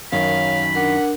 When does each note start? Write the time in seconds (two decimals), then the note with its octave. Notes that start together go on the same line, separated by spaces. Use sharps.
0.12 F#2 D#3 C#5 F5 B5
0.75 D4 A#4 F#5